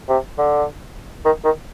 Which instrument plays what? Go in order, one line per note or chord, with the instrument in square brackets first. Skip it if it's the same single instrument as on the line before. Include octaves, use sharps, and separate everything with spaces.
[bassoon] C3
D3
D#3
D#3